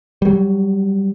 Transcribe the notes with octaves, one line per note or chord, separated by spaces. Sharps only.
F#3 G3